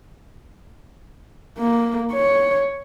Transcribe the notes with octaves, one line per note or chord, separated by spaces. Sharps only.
A#3
C#5